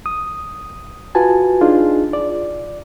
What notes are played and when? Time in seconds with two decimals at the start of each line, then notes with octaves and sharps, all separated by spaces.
0.06 D#6
1.15 F4 F#4 B4 G#5 A5
1.61 D4 D#4 F4 G#4
2.13 D5